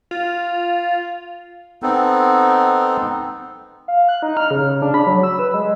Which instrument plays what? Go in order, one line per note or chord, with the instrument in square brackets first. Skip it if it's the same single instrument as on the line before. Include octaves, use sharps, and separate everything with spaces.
[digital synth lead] F4
[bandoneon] B3 C4 D#4 A4
[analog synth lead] F5
F#6
D#4
F6
C#3
C#3
D4
B5
F#3
E6
B4
G#3